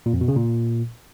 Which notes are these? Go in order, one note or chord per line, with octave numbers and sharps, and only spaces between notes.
A#2
F2
B2
C#3
A#2